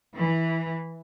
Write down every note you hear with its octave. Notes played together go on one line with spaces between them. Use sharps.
E3